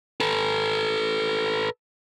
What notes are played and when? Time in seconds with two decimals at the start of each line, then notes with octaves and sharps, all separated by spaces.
0.20 A4 B4